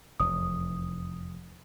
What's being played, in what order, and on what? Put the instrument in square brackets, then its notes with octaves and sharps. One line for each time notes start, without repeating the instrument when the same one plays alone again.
[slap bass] F1 E2 [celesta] D#6